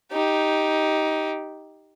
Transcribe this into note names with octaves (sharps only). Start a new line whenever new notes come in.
D#4 G4